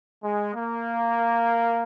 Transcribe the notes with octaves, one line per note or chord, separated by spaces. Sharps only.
G#3
A#3